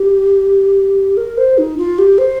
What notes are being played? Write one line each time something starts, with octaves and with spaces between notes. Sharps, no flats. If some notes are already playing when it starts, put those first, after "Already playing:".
Already playing: G4
A#4
C5
D#4
F4
G4
C5